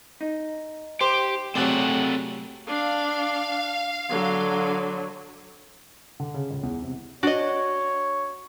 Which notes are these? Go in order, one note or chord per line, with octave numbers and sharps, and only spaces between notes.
D#4
G4 C5
C3 F#3 A3 C4 G#4 A4 D5 F#5
D4 F5
D3 F#3
D3
C#3
C#2
E2
C3
D4 F#4 C#5 D#5